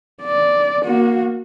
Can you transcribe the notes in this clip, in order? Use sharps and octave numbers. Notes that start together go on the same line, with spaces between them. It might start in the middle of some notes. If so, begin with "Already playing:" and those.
D5
A#3 F#4